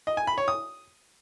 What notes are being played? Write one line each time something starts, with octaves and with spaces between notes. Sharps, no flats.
D#5
G#5
B5
C#5
D#6